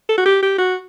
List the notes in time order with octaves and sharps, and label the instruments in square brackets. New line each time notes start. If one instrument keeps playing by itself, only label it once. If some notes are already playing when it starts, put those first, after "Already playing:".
[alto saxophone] A4
F#4
G4
G4
F#4